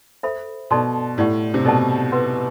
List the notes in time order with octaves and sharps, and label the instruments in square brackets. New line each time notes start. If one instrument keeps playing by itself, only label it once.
[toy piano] A4 C5 E5 B5
[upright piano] B2 [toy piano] A4 D5 A5 C6
[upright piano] A2 [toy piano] G4 D5 F#5
[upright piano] C3
[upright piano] B2 [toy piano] A4 D5 F#5 A5
[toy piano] B4 F#5 C6